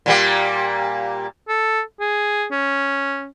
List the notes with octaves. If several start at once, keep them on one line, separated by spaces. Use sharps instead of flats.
A#2 G3 A#3
A4
G#4
C#4